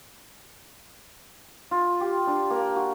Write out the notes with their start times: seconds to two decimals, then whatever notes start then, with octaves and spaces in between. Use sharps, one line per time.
1.71 F4
2.01 G4
2.27 D4
2.50 A#3
2.76 F#4